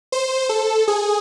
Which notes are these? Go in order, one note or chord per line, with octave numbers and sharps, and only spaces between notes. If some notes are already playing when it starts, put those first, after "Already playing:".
C5
A4
G#4